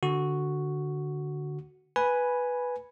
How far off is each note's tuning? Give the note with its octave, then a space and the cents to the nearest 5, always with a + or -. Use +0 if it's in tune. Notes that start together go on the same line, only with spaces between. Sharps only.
D3 +0 F#4 +0
B4 +0 G#5 +0 B5 -10